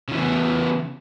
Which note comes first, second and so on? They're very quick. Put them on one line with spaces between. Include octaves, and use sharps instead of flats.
C#3 E3 E4 B3